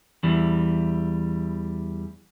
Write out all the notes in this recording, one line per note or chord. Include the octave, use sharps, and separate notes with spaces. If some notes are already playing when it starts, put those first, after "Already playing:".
E2 E3 G3